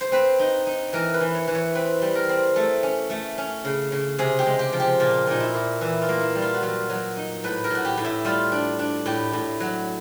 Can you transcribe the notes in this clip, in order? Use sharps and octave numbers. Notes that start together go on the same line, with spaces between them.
C5
C4 B4
D#4
D#4
E3 A#4
B4
E3
C#5
E3
C#5
C4 B4
G3
A#4
C4
A3 A4
C#4
A3
C#4
C#3
C#3
C3 G#4
G4
G#3
G4
F3
G4
A#2 F4
A#2 D#4
E4
A#2
E3 E4
F4
A#3
E4
G3
F4
F#4
F#3 F4
F#3
D#4
A2 B4
A#4
A2 F#4
G4
A2
E4
G3 F4
D4
D4
A2 G4
A2
F#3